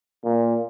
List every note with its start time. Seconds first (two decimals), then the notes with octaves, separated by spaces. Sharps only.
0.24 A#2